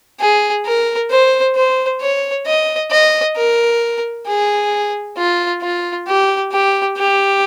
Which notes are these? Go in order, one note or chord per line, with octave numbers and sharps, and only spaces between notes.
G#4
A#4
C5
C5
C#5
D#5
D#5
A#4
G#4
F4
F4
G4
G4
G4